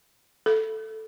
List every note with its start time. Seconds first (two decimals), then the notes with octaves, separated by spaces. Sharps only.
0.46 A4